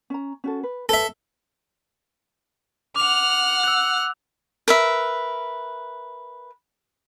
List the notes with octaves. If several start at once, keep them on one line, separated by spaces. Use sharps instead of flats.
C#4 A#5
C#4 F#4 A4
B4
A4 B4 C#5 E5
F#5 D6 F6 F7
E6 F#6
A#4 B4 E5